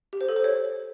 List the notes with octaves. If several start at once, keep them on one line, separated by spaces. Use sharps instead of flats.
G4
C5
A4
C5
C#5